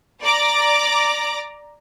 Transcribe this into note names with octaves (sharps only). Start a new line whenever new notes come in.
D5 A#5 D6